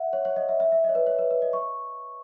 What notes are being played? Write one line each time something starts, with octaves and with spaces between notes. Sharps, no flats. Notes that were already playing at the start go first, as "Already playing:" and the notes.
Already playing: E5 F#5
C#5
C#5
D#5
E5
E5
E5
C#5 D#5
B4
C#5
B4
B4
D#5
C#6